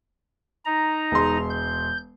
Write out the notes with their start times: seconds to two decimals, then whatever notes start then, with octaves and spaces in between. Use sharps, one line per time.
0.65 D#4 A#5
1.12 E1 G#3 C6
1.50 G6